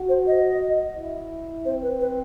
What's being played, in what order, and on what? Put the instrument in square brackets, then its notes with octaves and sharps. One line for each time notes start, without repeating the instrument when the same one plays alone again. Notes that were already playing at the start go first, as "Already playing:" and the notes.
Already playing: [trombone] F#4
[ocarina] C5
D#5
[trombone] E4
[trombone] C4 [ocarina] C5
[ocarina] B4
B4